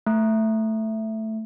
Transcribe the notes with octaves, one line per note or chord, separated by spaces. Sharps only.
A3